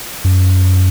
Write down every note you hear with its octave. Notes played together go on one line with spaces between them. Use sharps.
F#2